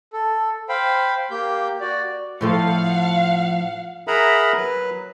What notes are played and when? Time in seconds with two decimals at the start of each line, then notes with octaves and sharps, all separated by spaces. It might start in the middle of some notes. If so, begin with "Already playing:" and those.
0.13 A4
0.69 C5 F5 G5 B5
1.31 A#3 G4 G6
1.81 F#4 D5
2.41 A2 F3 A4 F5 F#5
4.07 G#4 A#4 E5 F#5 A#5 B5
4.57 F#3 B4